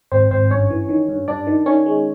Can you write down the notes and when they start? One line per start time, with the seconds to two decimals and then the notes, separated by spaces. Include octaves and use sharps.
0.12 G#1 C4 C5
0.31 G#1 C4 C5
0.51 G2 C#4 C#5
0.70 E3
0.89 D#3
1.09 G2
1.28 G2 D4 D5
1.47 D#3
1.66 D#3 C#4 C#5
1.86 G#3